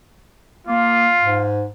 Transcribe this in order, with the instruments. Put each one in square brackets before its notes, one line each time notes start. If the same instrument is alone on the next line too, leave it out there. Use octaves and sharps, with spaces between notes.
[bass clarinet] A#3 [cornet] F4
[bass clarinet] G#2